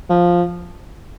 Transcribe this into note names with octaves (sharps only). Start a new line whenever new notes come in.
F3